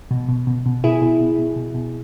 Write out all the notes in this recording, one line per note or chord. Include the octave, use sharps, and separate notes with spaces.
B2
B2
B2
B2
B2 E4 G#4
B2
B2
B2
B2
B2